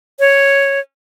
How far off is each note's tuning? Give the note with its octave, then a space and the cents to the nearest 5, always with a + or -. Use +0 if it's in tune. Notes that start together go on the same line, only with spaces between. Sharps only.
C#5 +0